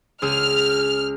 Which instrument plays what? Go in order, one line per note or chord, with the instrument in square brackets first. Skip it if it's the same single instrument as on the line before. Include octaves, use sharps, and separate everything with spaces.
[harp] C#2 G#4 E6 [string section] F6